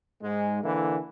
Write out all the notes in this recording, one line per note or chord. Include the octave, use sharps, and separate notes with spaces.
G#2 G#3
D3 E3 A#3 E4